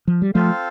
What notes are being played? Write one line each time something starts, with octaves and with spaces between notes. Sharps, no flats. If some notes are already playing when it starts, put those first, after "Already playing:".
F3
G3
F3 A3 C4 F4 A4 C5 F5